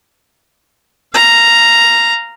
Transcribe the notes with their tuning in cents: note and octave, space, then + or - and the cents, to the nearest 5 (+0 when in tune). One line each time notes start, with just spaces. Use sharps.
F5 -15 A#5 +0